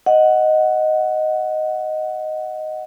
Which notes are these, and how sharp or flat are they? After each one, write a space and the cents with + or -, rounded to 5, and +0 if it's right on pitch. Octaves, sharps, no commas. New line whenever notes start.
D#5 +0 F#5 +0